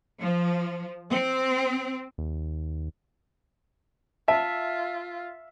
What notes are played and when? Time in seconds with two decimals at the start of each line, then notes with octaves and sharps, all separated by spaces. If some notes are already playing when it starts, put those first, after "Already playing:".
0.19 F3
1.10 C4
2.18 D#2
4.28 F4 E5 A5